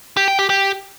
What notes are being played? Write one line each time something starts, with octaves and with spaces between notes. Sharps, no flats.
G4
G5
G4
G4